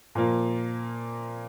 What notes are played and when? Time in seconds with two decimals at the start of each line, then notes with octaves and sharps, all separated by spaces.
0.15 A#2 F3 A#3